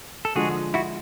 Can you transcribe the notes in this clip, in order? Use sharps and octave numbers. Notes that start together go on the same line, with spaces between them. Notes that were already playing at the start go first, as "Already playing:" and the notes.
A4
D3 F3 G#3 F#4 G#4
E4 F#4